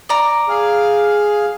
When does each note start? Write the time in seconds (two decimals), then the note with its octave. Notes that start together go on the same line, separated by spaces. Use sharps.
0.09 D5 A#5
0.49 G#4 F5